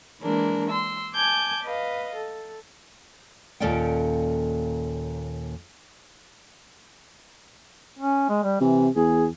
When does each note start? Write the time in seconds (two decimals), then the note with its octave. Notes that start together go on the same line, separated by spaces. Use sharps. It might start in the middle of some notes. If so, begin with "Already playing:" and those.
0.22 E3 G#3 A#3 D4 A#4
0.68 C6 E6
1.14 G#5 A5 D6 G6 G#6
1.63 B4 D#5 F5
2.16 A4
3.60 D#2 A#2 C#4 A4 D5 G5
7.99 C#4
8.29 G#3
8.43 G3
8.61 C3 E3
8.96 E2 G#4